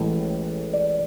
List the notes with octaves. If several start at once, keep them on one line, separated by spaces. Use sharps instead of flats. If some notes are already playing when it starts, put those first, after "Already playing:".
Already playing: A1 A2 G#3
D5